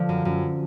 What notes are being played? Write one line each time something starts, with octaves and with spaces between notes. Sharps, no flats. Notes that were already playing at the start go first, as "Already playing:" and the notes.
Already playing: D3 F3
F#2
F#2